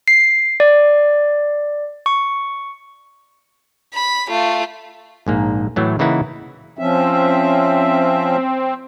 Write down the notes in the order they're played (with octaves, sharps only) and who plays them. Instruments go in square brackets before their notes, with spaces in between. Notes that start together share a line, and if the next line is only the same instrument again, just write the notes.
[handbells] C7
D5
C#6
[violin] B5
A3 F4
[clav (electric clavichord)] A#1 G#2 A#3
A2 E3 F#3 A3
C#3 E3 A#3 D#4 E4 F#5
[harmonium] F3 C#4 E5 [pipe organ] C4